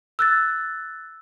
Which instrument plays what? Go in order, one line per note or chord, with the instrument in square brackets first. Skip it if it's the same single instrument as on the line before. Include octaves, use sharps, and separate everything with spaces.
[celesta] E6 F#6 A6